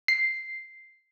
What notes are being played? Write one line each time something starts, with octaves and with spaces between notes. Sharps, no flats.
C7